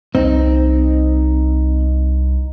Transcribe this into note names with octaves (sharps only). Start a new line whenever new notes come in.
C2 C4 D#4